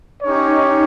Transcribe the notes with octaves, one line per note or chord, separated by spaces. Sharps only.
C#4 D#4 G4 C#5